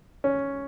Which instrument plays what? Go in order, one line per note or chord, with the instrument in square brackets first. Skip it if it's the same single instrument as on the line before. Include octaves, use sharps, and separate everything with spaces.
[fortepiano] C#4